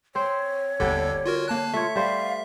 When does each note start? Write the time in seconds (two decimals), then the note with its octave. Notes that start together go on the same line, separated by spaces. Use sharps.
0.15 C4 C5 C#5
0.80 G1 D#2 D3 G3 D4 A4
1.26 F4 F#4 A#4
1.48 A#3 A5 F#6
1.74 A3 F4 C#5 E5
1.95 G3 C5 F5